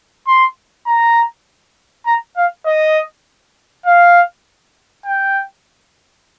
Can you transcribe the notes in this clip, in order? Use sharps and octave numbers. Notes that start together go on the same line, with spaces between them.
C6
A#5
A#5
F5
D#5
F5
G5